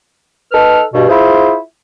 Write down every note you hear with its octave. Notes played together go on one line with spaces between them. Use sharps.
D#4 A4 B4 F6
G2 B2
E4 F4 G#4 C5